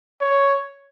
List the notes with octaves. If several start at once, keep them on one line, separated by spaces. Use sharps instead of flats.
C#5